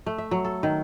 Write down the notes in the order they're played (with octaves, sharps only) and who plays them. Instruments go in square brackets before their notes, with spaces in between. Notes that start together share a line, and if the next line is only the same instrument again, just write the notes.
[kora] A3
E5
F#3
A4
D#3